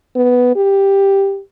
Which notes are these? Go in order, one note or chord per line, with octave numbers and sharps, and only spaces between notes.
B3
G4